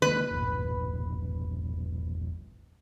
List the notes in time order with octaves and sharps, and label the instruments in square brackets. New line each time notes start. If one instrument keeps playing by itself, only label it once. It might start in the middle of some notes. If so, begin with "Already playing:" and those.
[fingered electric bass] D#3 G#3 A#3 [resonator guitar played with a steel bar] B4
[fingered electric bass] E1 A#1